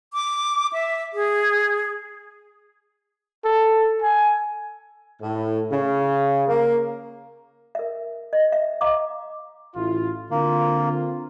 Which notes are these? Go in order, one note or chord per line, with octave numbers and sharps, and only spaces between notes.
D6
E5
G#4
A4
G#5
A2
C#3
A#3
A#4 E5
D#5
E5
D#5 F5 A#5 D6
A1 E4 F4
D3 A#3 C4 F4